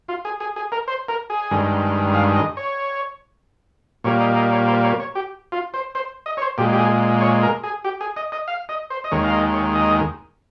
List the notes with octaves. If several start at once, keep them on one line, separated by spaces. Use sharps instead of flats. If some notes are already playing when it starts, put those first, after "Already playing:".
F4
G#4
G#4
G#4
A#4
C5
A#4
G#4
G2 D#3 G#3
F5
D#5
C#5
A#2 G3 A#3 C#5
D#5
D#5
C#5
C5
C#5
C#5
G4
F4
C5
C5
D#5
C#5
C5
A#2 G#3 G4
G4
G#4
C#5
A#4
G#4
G4
G#4
D#5
D#5
F5
D#5
C5
D#5
D#2 D#3 G#3 C#5
F5
D#5
C#5
D#5